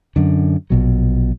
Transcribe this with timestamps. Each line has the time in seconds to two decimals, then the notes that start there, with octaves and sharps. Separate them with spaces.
0.16 F#2 D3
0.70 A#1 B2 F#3